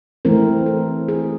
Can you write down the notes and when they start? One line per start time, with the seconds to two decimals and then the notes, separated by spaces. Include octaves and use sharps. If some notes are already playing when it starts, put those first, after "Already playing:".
0.25 E3 A3 C4 E4 A#4
0.66 A4
1.08 G#4